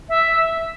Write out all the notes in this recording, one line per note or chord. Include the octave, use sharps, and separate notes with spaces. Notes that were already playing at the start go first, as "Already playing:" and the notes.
E5